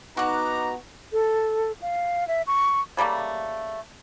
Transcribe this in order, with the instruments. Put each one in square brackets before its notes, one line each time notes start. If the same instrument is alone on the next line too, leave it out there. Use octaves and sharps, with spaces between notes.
[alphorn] B3 [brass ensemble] D#4 A#5 [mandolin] F#4 F#6 [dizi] D6
[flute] A4
F5
E5
C#6
[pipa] C#3 G3 A3 A#3